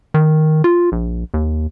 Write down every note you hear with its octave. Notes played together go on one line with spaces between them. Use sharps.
D#3
F4
A#1
D#2